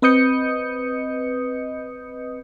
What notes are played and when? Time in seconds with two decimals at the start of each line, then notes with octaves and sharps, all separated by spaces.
0.02 C4 B4 D#5 D#6 G6 C#7